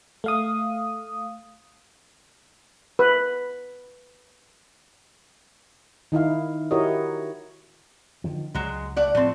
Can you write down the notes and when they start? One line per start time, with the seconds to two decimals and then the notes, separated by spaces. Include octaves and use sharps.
0.24 A3 F5 D#6
2.99 B4
6.12 D#3 D#4 E4 F5
6.71 E4 F#4 G4 A#4 C#5 D#5
8.24 D3 D#3 F3
8.54 C#2 F#3 G#3
8.96 A3 D5 F#5
9.15 A2 F3 A3 C4